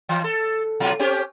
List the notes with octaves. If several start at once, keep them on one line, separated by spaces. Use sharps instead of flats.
E3
A4
B2 F#3 F4
C4 C#4 G4